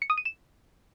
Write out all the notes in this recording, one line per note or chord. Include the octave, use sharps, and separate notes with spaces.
C#7
D#6
D#7
E7